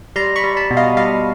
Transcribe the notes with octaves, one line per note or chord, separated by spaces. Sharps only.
G3 A#5 C6
B5 C#6
G3
A5 B5
B2
D#5 F5
G3 D#5 F5